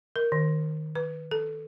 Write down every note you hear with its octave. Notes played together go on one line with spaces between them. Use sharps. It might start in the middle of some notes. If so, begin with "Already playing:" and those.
A#4
D#3
B4
A4